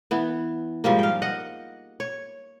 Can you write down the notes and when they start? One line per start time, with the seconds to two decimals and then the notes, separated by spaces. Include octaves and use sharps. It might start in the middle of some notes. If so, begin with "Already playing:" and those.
0.11 E3 B3
0.84 G#2 F3 G3 A#3
0.99 F5 G5
1.22 D#5 F#5
2.00 C#5